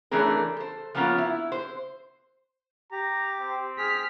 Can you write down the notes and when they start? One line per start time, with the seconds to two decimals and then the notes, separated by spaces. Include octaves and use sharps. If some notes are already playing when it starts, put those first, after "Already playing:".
0.11 E3 A3 C#4 D4 G#4 A#4
0.57 A4 C5
0.95 F3 G3 A#3 B3 C#4 F4
1.18 E4
1.52 C5
2.92 G4 A#5
3.41 C4
3.78 G#4 F6 B6